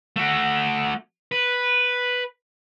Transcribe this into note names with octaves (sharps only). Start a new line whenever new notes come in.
A3 F#4
B4